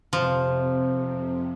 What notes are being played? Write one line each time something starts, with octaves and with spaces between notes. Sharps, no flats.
F2 C3 F3